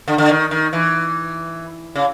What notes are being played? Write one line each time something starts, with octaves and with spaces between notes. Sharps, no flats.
D3
D3
D#3
D#3
E3
C#3